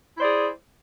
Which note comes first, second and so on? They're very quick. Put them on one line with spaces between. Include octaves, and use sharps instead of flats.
E4 C5 D5 G#4